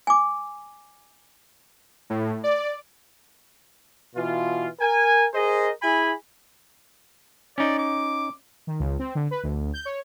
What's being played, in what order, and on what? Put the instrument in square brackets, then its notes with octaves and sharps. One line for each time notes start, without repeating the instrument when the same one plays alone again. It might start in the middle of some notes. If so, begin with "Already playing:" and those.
[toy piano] G#5 D6
[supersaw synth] A2
D5
[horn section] B2 E3 F4
A#4 G#5
G#4 A#4 C5 D#5
E4 G#4 G#5 B5
[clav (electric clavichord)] C#4 D#4 [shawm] D5
[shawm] D6
[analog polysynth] D#3
C#2
C4
D3
B4
D2
G6
C#5